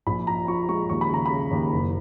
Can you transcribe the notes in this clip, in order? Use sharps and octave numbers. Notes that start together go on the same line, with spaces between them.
A#1 B5
F3 A#5
F3 C#6
G#3 C#6
D#2 C#6
B5
C#3 A#5
C#3 B5
D#2
F#1